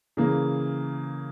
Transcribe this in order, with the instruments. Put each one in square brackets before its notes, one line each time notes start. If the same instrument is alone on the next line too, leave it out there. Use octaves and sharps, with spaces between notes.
[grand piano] C#3 E3 A#3